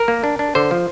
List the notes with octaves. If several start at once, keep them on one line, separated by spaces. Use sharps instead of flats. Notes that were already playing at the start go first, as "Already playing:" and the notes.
Already playing: A#4
A#3
D4
D4
D3 C5
F3